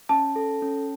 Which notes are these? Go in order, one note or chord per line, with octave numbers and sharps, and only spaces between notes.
C#4 A5
A4
C#4